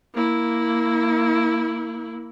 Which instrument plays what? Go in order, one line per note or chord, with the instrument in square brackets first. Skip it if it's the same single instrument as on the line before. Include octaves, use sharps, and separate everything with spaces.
[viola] A#3 E4